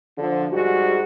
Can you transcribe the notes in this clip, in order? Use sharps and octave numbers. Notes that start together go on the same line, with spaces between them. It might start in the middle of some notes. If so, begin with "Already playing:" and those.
D3 F3
G#2 G3 F#4